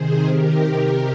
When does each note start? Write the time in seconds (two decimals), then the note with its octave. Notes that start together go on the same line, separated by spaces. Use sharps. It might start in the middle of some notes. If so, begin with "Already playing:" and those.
Already playing: C3 D#3 G#4 C5
0.24 C3 D#3 G4 A#4